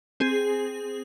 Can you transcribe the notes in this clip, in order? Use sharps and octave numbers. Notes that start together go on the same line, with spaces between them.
C4 G#4